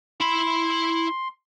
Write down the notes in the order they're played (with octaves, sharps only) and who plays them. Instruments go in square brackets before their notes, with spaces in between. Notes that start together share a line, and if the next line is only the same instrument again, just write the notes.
[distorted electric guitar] E4 B5 [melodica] C6